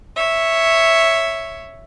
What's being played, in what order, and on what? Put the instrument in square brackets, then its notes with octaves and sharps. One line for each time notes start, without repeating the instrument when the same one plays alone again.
[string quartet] C#5 E5